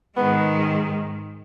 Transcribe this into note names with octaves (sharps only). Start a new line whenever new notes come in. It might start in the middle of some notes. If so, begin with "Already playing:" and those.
G#2 D#3 G#3 B3